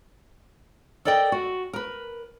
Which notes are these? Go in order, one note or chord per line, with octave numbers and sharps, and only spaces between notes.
A4 A#4 D5 D#5 G5
F#4
A#4 B4